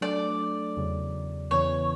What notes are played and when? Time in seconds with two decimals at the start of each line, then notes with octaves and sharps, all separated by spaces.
0.01 F#3 A3 D4 A4 D5
0.77 E2 C#3 F#3
1.51 E2 C#3 E3 B3 C#5